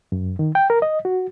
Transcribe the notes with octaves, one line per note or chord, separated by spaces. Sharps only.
F#2
D#3
G5
A#4
D#5
F#4